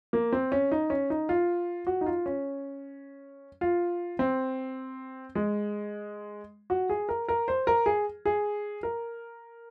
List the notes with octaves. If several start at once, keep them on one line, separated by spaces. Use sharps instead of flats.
A#3
C4
C#4
D#4
C#4
D#4
F4
F#4
D#4
F4
C#4
F4
C4
G#3
F#4
G#4
A#4
A#4
C5
A#4
G#4
G#4
A#4